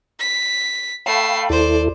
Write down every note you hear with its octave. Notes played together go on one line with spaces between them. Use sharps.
B6
A3 F5 G5 B5 C7
D#2 E4 A4 C5 D5